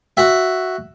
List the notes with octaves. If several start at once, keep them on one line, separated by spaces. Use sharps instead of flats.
F#4 E5